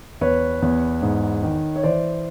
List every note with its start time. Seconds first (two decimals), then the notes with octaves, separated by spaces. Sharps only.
0.21 E2 B4 C#5
0.62 E2
1.02 G#2
1.43 D#3
1.76 C#5
1.84 E3 C5 D5